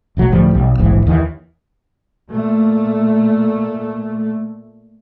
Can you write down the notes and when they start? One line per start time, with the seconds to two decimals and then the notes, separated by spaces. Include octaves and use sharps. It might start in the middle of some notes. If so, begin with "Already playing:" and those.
0.17 F1 B1 F#3 A3
0.32 D2 A2 F3 G3
0.54 B1 G3
0.79 D1 A#1 G#2 E3
1.07 D#2 D#3 E3
2.30 A#2 A3